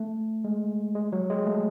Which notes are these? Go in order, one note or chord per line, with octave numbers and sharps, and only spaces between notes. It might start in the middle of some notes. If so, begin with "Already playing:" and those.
Already playing: A3
G#3
G#3
F#3
G#3
A3